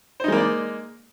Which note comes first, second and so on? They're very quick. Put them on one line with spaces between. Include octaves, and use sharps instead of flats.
C5 D#4 G#3 A#3 D5